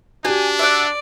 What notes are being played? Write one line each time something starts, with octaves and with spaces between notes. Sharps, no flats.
D4 F#4 G4 G#5
D5 E5 F#5